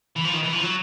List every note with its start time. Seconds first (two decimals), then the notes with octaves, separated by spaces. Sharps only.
0.16 E3
0.24 F3
0.34 D#3
0.43 E3
0.53 F3
0.62 F#3